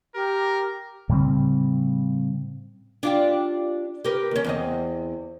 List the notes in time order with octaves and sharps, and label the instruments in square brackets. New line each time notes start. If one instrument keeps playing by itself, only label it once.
[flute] G4 [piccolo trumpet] A#4
[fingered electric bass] A2 C#3 G3 C4
[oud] D4 F4 G4
G4 A#4 B4
D#2 C#4
E2 C4 D#5